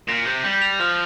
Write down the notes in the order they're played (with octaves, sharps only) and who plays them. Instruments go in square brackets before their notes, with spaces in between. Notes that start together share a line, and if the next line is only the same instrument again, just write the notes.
[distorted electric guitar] A#2 [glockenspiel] A#6
[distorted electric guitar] C3 [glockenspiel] G6
[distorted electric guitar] G3 [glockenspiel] G6
[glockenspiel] F7
[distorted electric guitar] F3 [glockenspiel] F6